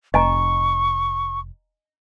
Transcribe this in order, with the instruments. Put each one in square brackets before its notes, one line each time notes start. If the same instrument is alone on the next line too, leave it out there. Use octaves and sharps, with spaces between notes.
[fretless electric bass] F1 [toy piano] D#5 G#5 A#5 [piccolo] C#6